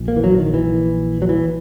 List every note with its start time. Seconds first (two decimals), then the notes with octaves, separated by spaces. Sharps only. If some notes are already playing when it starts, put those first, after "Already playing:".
Already playing: A#1 A#2
0.08 A#3
0.16 E3
0.24 F#3
0.38 D#3
0.54 E3
1.22 F#3
1.29 E3